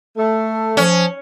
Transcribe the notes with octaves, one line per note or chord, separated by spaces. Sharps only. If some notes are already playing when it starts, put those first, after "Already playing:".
A3
F3 C#4